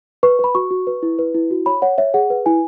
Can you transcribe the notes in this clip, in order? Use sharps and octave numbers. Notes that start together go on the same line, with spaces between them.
B4 C#6
B4 B5
F#4 C#6
F#4
B4
E4
B4
E4
F#4
C#5 B5
C#5 F#5
C#5 E5
G#4 F#5
B4
E4 G#5